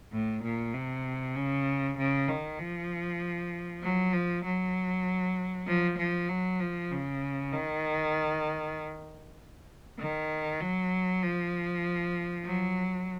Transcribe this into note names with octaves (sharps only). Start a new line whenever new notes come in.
A2
A#2
C3
C#3
C#3
D#3
F3
F#3
F3
F#3
F3
F3
F#3
F3
C#3
D#3
D#3
F#3
F3
F#3